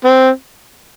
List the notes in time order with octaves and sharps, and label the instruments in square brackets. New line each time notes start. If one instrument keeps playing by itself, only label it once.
[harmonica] C4